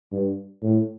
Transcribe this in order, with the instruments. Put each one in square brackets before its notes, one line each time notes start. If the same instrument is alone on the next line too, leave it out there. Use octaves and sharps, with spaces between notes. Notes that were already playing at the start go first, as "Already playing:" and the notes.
[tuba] G2
A2